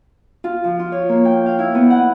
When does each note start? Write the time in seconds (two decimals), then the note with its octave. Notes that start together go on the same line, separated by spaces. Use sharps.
0.44 F4
0.64 F3
0.79 F4
0.92 C#5
1.09 A#3
1.25 G5
1.46 F5
1.59 E4
1.75 B3
1.90 F#5